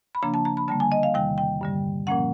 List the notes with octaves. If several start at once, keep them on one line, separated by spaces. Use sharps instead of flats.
B5
C#3 F3 A#3 D4 A#5
A5
A#5
B5
D3 G3 A#3 A5
G#5
D#5
F5
E2 C3 D#3 G3 G5
G5
G2 D3 G3
A#2 F3 A#3 C#4 F#5